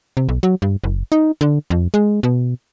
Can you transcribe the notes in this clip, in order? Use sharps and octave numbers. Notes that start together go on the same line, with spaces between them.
C3
B1
F#3
G2
F#1
D#4
D3
F2
G#3
B2